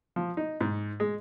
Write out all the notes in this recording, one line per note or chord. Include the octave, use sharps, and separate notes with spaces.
F3
D#4
G#2
G#3